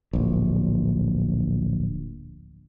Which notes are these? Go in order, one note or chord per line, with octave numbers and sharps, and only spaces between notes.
D1 A#1